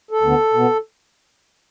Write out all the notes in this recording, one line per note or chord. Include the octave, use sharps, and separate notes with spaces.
A4
D2 D3 B3
B2 B3